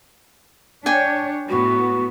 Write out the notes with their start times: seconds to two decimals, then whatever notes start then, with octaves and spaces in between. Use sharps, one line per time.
0.86 D4 C#5 G5 G#5
1.49 A2 B3 F#4